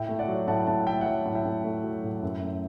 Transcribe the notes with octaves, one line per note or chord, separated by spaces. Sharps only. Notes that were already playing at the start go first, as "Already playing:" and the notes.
Already playing: A2 E5 G5
A3
D5 F#5
F#3
A2 F#5 A5
A2 F#5 A5
A3 E5 G5
F#5
F#3 E5 G5
A2
E5 G5
A2
A3
F#3
A2
F#2
A3